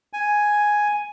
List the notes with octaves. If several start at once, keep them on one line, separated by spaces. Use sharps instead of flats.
G#5